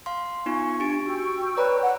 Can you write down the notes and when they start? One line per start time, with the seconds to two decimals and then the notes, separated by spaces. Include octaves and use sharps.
0.06 F5 C6
0.46 B3 D#4 F4 G#5 C#6
0.80 D4 G4 D7
1.06 F#4 G5 C#6 E6
1.57 B4 C#5 D5 A#5 B5
1.83 F#5